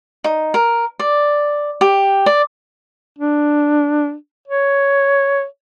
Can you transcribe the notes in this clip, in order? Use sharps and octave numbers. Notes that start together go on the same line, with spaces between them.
D#4
A#4
D5
G4
D5
D4
C#5